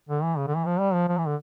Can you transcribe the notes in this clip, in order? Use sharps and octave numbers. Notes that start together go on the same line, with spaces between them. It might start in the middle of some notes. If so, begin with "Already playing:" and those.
D3
E3
C#3
D3
E3
F3
G3
F3
F3
E3
D3